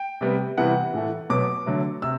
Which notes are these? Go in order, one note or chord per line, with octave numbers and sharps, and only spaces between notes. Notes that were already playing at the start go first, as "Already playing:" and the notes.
Already playing: G5
C3 G3 B3
C3 E3 G3 B3 F#5
A2 E3 A3
B2 F#3 B3 D6
D3 F#3 A3
C3 E6